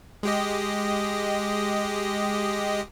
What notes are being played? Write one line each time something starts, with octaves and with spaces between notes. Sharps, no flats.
G#3 G4 D#5